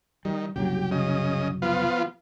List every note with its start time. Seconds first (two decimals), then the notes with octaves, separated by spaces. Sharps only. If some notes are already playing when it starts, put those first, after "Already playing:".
0.25 D#3 G3
0.56 F#1 C2 F#3 G4
0.91 C#3 D#5
1.62 F3 B3 F4